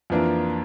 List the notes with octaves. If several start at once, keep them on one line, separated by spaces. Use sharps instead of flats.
F2 E3 A#3 D4 F4